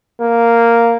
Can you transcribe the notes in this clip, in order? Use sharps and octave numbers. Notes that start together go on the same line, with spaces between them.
A#3